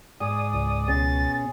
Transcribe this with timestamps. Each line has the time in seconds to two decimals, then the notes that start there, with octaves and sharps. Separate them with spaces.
0.20 G#2 G#4 D5 D#6
0.53 C#2
0.88 C#2 B2 C#4 G#4 A6